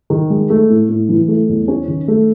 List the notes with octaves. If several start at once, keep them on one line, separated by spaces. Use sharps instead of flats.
D#3
G#3
A3
A2
A2
E3
A3
E2
C#4
D#3
A3